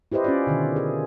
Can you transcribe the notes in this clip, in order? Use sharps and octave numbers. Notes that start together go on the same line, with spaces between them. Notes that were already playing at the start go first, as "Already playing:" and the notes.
E4 G4 B4 C5 D#5
C#4 F4 D5
B2 D3 D#3
G#4